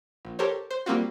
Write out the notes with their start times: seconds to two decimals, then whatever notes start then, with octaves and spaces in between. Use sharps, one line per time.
0.25 A#1
0.39 G4 A4 A#4 C5 C#5
0.71 C5
0.86 G3 A#3 C4 F4 F#4